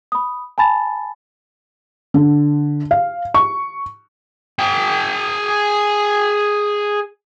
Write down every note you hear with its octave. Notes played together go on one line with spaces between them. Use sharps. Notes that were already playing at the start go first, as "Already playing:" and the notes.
B5 D#6
G#5 A5 B5 A6
D3
F5
C#6
G#4 G5